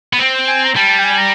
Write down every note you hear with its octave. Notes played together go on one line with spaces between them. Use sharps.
B3
C4
G#5
A#5
G3 A5
A5
G5
G#5
A#5